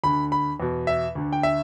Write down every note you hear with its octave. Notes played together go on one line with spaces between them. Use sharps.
D2 D3 B5
B5
E2 B2
E5
D2 D3
G5
E5